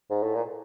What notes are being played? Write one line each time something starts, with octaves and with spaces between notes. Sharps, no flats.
G#2
A2
A#2